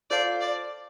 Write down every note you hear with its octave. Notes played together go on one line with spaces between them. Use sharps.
F4 A4 C5 D5 F5 A5
D5